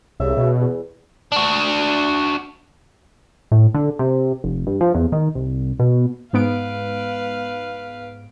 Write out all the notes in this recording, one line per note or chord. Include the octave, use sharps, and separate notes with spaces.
C2 C#3 E5
B2
E2
D4 F#4
A2
D3
C3
F1
G2
F3
E2
D#3
C2
B2
G#2 B3 B4 F5 D7